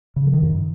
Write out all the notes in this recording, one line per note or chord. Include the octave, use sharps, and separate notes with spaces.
C#3
F3
D#3
F#2